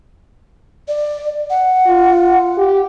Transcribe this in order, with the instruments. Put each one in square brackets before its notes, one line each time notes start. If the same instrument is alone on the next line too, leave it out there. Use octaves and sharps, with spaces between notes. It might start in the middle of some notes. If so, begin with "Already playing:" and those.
[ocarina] D5
F#5
[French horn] F4
G4